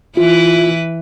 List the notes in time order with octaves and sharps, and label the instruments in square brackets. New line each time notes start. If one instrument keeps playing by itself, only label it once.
[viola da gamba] E3 E4 B4 [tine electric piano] F4